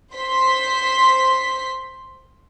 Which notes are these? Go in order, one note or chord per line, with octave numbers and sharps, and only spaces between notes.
C5 C6 B6